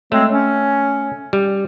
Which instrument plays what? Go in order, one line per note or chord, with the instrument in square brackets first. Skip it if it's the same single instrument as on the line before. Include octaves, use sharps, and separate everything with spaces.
[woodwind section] F#3 G#3 C4 [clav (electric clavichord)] A3
[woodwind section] C#4
[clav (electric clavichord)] G3